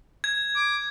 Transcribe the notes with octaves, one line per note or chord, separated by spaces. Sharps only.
G#6
D6